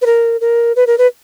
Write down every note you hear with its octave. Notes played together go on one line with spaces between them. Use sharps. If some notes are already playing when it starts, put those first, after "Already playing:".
B4
A#4
A#4
B4
A#4
B4